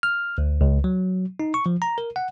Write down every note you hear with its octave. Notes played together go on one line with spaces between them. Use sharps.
F6
D2
C#2
F#3
D#4
C#6
F3
A#5
A#4
F#5